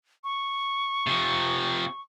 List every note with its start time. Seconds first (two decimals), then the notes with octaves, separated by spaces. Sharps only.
0.24 C#6
1.07 C3 F3